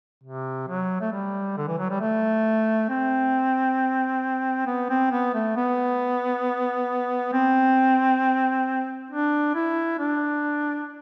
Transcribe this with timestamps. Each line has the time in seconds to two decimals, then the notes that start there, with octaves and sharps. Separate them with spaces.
0.23 C3
0.68 F#3
1.01 A3
1.12 G3
1.57 D3
1.67 E3
1.78 F#3
1.90 G3
2.00 A3
2.89 C4
4.66 B3
4.89 C4
5.11 B3
5.34 A3
5.56 B3
7.33 C4
9.10 D4
9.55 E4
9.99 D4